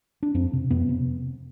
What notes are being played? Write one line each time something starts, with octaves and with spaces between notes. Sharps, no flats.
D4
F2 C4
C3
F2 B3
C3